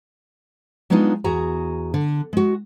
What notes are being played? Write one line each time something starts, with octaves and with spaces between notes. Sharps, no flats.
F#3 G#3 B3 D4 D#4 F4
E2 F#4 G#4 A#5
D3
G#3 F#4